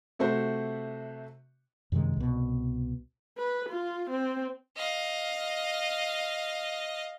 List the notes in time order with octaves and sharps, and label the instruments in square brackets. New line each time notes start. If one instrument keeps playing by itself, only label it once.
[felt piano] C3 A3 F#4 C5
[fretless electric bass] F#2 C3 D#3 G#3
C2 B2
[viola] B4
F4
C4
[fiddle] D#5 F5